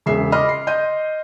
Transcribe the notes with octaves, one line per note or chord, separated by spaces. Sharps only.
E1 C#3 E5 C7
D#5 B5 C6 D6 F6
C7
D#5 C6 G6 D#7